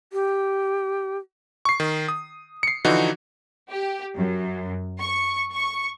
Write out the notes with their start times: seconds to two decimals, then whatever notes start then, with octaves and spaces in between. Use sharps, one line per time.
0.13 G4
1.65 C#6 C7
1.80 D#3
2.08 D#6
2.63 C7 C#7
2.85 D3 E3 F3 D#4 F#4
3.71 G4
4.18 F#2
4.99 C#6
5.52 C#6